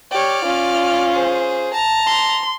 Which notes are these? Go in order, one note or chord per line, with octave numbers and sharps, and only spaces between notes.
G4 C#5 D5 F6
C#4 F4
G#4 C5
A5 A#5
C6